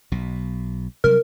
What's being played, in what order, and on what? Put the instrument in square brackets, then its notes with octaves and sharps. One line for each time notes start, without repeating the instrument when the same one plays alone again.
[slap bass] B1 B2
[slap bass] C3 F#3 G3 [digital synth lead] A#4